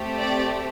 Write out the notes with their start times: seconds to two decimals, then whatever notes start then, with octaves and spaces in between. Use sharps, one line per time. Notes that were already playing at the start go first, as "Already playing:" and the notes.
Already playing: A3 C4 G4
0.19 D5